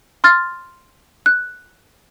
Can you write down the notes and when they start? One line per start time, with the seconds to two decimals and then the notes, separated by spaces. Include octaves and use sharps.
0.24 C6 F6 A6
1.26 F#6